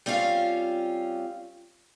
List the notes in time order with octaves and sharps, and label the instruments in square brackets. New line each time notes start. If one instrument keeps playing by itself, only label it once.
[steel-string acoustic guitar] G3 C4 C#4 F4 F5